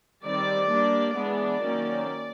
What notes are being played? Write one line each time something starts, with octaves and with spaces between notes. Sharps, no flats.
D#3 G3 C4 D5
G3 A#3 D4
E3 G#3 B3 D4 D5
D#3 F#3 A#3 C#4